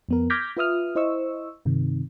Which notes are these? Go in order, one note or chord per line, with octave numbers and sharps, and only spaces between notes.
F2 B3 A#4
D6 F6 G6 G#6 A#6 B6
F4 B4 E5 D#6 F6
E4 C5 D#5 C#6 E6
G2 C3 D#3